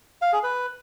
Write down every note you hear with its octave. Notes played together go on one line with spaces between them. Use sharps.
F5
G#4
B4